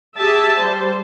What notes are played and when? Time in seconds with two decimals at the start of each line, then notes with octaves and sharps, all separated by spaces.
0.17 G4 G#4 E5 A5
0.58 G3 C5